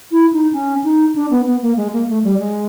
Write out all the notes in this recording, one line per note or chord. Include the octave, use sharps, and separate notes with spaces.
E4
D#4
C#4
D#4
D4
B3
B3
A#3
G#3
A#3
A3
G3
G#3